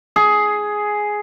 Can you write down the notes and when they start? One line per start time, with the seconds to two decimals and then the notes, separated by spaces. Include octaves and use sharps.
0.16 G#4